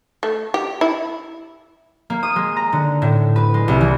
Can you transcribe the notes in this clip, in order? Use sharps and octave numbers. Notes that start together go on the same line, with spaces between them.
A3
G4
E4
A#3
D#6
G#3
A#5
D3
A2
B4
G#3
C2
E3